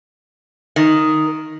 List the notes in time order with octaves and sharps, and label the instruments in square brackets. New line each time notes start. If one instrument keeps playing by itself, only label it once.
[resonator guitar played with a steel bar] D#3